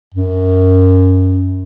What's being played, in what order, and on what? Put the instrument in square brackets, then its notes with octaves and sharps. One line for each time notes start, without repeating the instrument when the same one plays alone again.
[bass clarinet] F#2